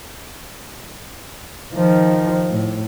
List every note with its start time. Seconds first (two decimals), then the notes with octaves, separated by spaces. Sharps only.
1.74 D#3 F3
2.51 A2